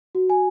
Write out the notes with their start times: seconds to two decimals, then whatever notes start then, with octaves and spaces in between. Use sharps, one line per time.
0.15 F#4
0.30 G#5